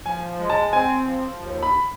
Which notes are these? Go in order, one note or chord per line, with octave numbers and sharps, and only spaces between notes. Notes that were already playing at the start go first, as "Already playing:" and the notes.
F3 G#5
G#3
A5
C4 G#5
F3
D#2
B5